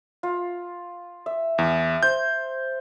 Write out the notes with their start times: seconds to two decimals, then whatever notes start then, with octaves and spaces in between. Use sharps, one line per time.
0.23 F4
1.26 E5
1.58 E2
2.03 C5 G6